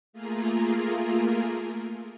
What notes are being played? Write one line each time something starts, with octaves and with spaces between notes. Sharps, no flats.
A3 A#3 F4 G#4 A#4